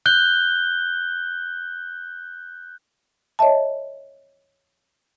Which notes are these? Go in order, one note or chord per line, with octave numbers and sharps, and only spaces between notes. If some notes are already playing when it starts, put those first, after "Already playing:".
F#6 G6 G7
C#5 D#5 E5 A5